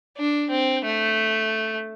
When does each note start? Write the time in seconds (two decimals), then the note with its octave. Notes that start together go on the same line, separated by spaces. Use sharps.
0.17 D4
0.50 C4
0.84 A3